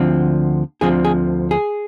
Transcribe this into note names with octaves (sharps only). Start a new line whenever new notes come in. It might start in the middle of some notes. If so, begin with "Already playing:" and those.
Already playing: D2 D3 F3 C4
D2 D3 F3 C4 G#4
G#4
G#4